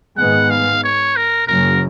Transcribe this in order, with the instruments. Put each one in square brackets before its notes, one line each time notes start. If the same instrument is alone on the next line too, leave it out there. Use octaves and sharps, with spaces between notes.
[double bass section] G#2 D#3 G#3 B3 [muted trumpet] F#5
[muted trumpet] F5
C#5
A#4
[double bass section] F#1 F#2 C#3 F#3 [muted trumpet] A#4